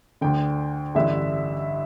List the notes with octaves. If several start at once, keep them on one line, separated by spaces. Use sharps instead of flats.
D2 D3 G5
A1 G2 D3 E5